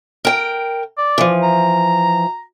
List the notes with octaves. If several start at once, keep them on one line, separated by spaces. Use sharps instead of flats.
A#4 G5
D5
E3 F3
A#5